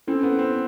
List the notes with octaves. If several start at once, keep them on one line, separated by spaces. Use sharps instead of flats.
C4 C#4 E4 A4
B3
C4